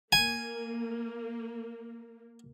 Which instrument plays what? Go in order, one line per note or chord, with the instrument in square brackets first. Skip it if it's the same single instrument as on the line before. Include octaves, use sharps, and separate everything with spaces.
[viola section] A#3 [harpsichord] G#5